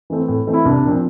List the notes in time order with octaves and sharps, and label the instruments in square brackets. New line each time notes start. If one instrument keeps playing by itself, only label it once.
[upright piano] E3 A3 C4
A2
E3 A3 C4
E4
C2 D4
A#2 F3 C4